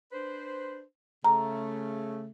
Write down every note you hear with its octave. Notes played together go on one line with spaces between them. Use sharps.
D4 B4 C5
C#3 A3 A#5